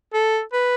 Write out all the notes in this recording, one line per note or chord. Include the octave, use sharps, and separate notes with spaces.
A4
B4